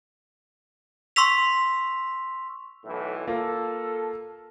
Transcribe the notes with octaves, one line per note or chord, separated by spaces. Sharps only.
C6 C#6 E6 B6 F7
B1 A2 E3
A#3 F4 A4